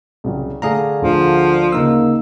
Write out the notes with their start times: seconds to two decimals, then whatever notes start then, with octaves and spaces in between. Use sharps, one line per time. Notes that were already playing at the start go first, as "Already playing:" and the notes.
0.24 C2 C#3 F#3
0.62 D3 A3 D4 G#4 F5 A#5
1.02 D2 D3 F3
1.72 C#3 A#3 D#4 E6